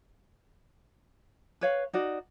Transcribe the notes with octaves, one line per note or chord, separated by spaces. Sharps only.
B4 C#5 F5
D#4 F#4 D5